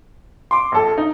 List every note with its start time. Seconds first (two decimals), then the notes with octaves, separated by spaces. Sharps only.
0.51 C6 D6
0.72 A#1 A4
0.98 D#4